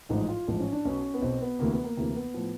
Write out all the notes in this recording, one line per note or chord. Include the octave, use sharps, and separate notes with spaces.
A1 G#2 F3 D#4
F4
A1 G#2 F3
C#4
D4
B1 B2 C#4
B3
B1 B2 C4
B3
D2 C3 E3 A#3
B3
A#3
D2 C3 E3 A#3
B3
A2 F3